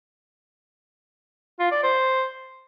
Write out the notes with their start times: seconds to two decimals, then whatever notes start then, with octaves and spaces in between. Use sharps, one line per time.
1.59 F4
1.71 D5
1.83 C5